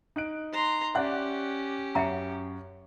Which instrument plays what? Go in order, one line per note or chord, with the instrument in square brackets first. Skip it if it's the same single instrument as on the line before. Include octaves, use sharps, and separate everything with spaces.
[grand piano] D#4 F#6 D7
[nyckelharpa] A#5 C6
[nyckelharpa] C#4 G4 [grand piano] D5 F#6 [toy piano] E5 F#5
[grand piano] F#2 C#7 [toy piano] E5 F#5 A#5